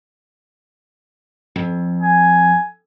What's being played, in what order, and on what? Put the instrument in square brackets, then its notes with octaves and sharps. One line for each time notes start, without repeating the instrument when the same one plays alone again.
[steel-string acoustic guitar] F2
[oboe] G#5